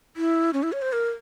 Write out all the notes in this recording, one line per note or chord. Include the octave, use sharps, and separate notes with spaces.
E4
C#4
E4
C#5
C5
A#4